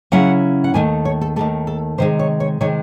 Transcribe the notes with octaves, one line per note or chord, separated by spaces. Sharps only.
C#3 F#3 C#4 E4 F#5
F#5
D#2 D#3 A3 G#5
C#5
A4
D#2 D#3 A3 A4
A4
C3 D#3 G#3 C5
C#5
C#5
C3 D#3 G#3 C#5